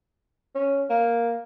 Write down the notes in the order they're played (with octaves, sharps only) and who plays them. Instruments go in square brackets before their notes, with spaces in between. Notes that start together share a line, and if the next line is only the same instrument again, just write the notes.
[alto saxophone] C#4
A#3